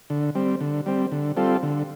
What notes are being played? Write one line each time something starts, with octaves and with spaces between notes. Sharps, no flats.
D3
G3 C4
D3
G3 C4
D3
G3 C4 F4 A4
D3